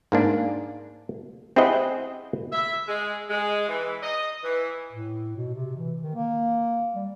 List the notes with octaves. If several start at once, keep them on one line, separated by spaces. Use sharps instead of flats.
G#2 A#3 D4
C4 E4 G4 G#4 D#5 F#5
E5
G#3
G#3
E3
D#5
E3
A2
B2
C3
E3
D#3
A#3
G3